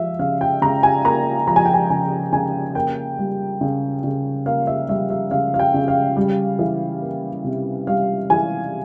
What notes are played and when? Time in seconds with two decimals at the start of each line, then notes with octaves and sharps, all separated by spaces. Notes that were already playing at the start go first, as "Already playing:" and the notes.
Already playing: F3 E5 F5
0.19 C#3 F5
0.41 G5
0.62 C#3 A#5
0.83 G#5
1.05 A#3 A#5
1.48 F3 A#5
1.56 G#5
1.65 G5
1.74 G#5
1.90 C#3 G#5
2.33 C#3 G#5
2.75 A#3 G5
3.19 G3
3.61 C#3
4.04 C#3
4.46 A#3 F5
4.67 E5
4.89 G3 E5
5.10 E5
5.31 C#3 F5
5.54 F5
5.59 G5
5.74 C#3
5.88 F5
6.17 G3
6.59 E3
7.02 A#3
7.44 C3
7.87 G3 F5
8.30 E3 G#5